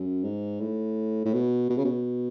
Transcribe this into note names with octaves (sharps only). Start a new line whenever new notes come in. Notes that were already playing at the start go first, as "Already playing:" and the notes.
Already playing: F#2
G#2
A2
A2
B2
B2
C#3
B2